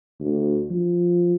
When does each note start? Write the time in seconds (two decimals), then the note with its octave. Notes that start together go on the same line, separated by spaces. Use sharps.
0.20 D2
0.70 F3